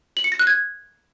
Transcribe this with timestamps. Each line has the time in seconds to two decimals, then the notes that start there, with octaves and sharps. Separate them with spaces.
0.17 F#7
0.24 C#7
0.32 A#6
0.39 F#6
0.47 G#6